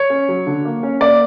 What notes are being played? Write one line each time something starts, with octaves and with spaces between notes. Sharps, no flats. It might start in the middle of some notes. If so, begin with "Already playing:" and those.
Already playing: C#5
C#4
F#3
D3
A#3
C#4
A#3 D5